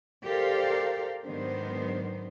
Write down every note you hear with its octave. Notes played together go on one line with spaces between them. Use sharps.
G4 A4 A#4 C5 D5 F5
G#2 D#3 F#3 B3 D4 C5